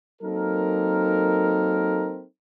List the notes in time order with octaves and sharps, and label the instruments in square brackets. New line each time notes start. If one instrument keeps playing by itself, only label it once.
[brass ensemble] F#3 A#3 C4 D#4 A4 A#4